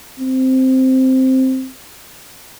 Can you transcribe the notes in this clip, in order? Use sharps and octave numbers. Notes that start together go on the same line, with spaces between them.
C4